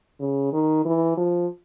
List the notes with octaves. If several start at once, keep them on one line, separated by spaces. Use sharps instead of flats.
C#3
D#3
E3
F3